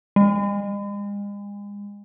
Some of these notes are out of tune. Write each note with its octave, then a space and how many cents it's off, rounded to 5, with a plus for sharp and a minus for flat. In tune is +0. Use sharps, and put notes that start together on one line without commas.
G#3 -40